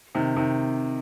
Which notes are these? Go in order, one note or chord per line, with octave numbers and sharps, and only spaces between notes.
C3 D#3
C3 D#3